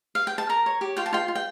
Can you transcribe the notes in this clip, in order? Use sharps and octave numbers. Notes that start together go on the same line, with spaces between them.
F5
G5
A5
A#4 A#5
C#5
G4
F4 G5
A5
F4 G5
F4
G5